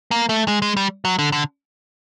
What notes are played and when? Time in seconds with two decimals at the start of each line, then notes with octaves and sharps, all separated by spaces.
0.11 A#3
0.29 A3
0.48 G#3
0.62 G#3
0.77 G3
1.05 F#3
1.19 D3
1.32 D3